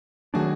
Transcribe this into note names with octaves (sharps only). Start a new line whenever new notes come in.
D#3 F#3 A3 D4 F#4 G#4